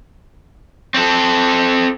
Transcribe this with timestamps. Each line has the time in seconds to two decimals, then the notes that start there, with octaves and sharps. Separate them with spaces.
0.94 C4 A4